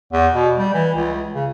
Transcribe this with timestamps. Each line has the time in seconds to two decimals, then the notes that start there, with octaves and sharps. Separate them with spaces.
0.13 E2
0.34 B2
0.58 G3
0.74 E3
0.95 C#2
1.35 C#3